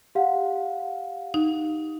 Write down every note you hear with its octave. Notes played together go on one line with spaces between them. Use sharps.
G4 F5 F#5
D#4